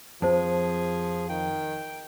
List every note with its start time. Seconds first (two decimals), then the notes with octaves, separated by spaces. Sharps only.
0.22 F2 F3 G#4 C5 A5
1.29 D#3 G5